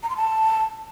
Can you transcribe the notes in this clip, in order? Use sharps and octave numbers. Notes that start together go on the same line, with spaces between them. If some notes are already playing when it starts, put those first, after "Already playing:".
A#5
C6
A5